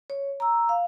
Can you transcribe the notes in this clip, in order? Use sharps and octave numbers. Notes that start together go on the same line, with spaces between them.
C#5
A#5 E6
F5